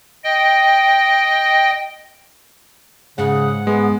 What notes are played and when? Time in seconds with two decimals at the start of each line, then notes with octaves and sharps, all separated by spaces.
0.24 D#5 G5
3.18 G#2 C#3 F#5
3.67 G#3 B3